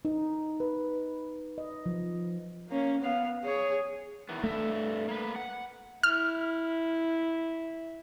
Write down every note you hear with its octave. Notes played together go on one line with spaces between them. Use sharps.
D#4
B4
D#5
F3
A#3 C#4
B3 F5
G#4 C#5
D#3 E3 B3
G2 A3 E5
A#3 B4
F#5
E4 F6